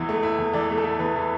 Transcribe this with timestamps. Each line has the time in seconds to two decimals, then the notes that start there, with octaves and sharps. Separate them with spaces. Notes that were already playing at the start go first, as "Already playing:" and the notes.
Already playing: E2 E3 E4
0.09 A3
0.23 E4
0.38 E2
0.53 E3 D5
0.70 A3
0.77 A4
0.84 E4
0.99 E2 B4
1.15 E3